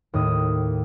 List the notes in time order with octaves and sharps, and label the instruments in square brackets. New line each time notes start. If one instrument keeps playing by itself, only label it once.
[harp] D#2 A2 D#5 D#6